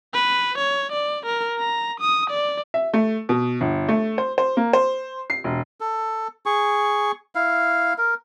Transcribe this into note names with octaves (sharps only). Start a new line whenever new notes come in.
B4
C#5
D5
A#4
A#5
D#6
D5
E5
A3
B2
G1
A3
C5
C5
A#3
C5
C7
E1
A4
G#4 C#6
E4 F5
A#4